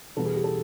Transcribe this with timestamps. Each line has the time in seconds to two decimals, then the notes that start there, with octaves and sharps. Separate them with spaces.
0.16 E2 B2 G3 B3 A4
0.26 G#4
0.35 G4
0.44 A4